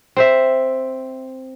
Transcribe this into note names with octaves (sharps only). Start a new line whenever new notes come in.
C4 C5 E5